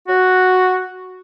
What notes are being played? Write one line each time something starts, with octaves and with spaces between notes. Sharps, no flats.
F#4